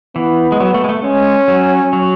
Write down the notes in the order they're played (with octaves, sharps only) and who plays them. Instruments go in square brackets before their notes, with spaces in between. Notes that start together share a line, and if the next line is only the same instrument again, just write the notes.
[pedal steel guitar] E3 [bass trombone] B3
[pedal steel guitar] G#3
F#3
A3
G#3
A3
[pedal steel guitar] G#3 [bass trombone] C#4
[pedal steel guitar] F#3
F#3